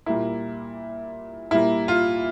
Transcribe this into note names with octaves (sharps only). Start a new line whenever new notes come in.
A#2 G3 A#3 E4
A#2 G3 A#3 E4
F4